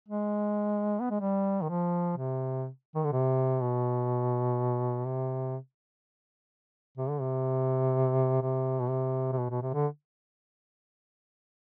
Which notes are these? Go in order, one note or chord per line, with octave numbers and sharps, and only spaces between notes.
G#3
B3
G#3
G3
D#3
F3
C3
D#3
D3
C3
B2
C3
C3
D3
C3
C3
B2
C3
C3
B2
B2
C3
D3